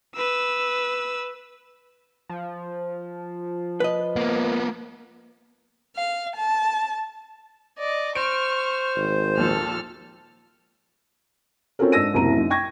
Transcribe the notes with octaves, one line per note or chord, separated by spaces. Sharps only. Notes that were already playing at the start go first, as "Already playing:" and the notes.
B4 E6
F3
B4 D#5
A#3 B3
F5
A5
D5 D#5
C5 C#6 F6 D7
G#1
D#2 A#2 F3 A4 F6
C4 C#4 F4 F#4 A4 A#4
G#2 D4 E6 A#6 D#7
F#1 C2 A2 F#3 A#5 D#7
F#2 D#4
G5 C#6 G#6 A#6